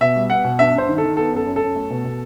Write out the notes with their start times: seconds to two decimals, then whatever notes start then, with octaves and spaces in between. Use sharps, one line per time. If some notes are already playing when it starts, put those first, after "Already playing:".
0.01 B2 E5
0.16 G3
0.30 B3 F#5
0.44 B2
0.59 G2 E5
0.74 G2 C5
0.89 D#3
0.98 A4
1.03 D#3
1.17 B3 A4
1.32 F#2 A4
1.46 F#2
1.56 A4
1.61 F#2
1.75 A3
1.90 B2
2.05 B2